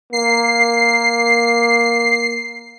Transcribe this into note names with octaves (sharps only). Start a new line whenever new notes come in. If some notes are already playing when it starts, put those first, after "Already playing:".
A#3 C7